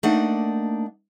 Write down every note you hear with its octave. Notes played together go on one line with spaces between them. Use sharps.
A3 A#3 D4 D#4 F#5